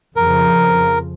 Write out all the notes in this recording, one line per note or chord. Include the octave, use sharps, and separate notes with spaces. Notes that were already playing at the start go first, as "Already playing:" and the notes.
F2 C#3 F3 A#4